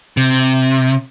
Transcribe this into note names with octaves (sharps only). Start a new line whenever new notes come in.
C3